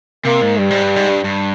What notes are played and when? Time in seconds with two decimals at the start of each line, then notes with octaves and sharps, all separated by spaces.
0.25 C3 A#3
0.42 G#2
0.58 G2 G3
0.70 G#2
0.83 G2
0.96 G#2
1.09 G2
1.24 G2